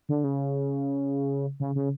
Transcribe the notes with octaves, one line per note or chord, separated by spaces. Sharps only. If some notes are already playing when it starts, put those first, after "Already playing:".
D3
C#3
C#3
C#3